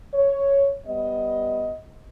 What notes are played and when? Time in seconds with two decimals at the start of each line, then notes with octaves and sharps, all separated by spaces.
0.14 C#5
0.86 G3 B3 D#5